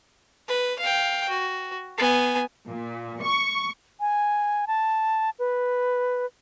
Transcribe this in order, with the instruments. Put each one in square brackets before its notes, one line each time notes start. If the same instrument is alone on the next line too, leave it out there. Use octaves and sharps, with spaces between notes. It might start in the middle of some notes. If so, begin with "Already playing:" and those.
[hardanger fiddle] B4
F5 G5
F#4
B3 G#5
[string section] A#2
C#6
[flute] G#5
A5
B4